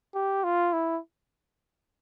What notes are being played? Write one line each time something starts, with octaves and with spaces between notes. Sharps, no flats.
G4
F4
E4